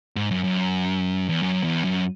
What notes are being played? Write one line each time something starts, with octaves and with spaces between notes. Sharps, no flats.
G#2
F#2
F#2
E2
F#2
E2
F#2